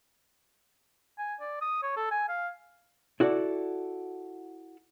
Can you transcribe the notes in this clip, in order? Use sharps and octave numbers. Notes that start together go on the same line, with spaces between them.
G#5
D5
D#6
C#5
A4
G#5
F5
E4 F#4 A4 D5